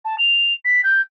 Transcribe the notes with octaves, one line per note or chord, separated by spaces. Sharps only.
A5
F7
B6
G6